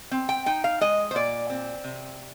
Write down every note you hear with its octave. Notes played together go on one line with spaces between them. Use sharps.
C4
G5
D#4 G5
F5
G#3 D#5
C5
A#2 D5
C4
C3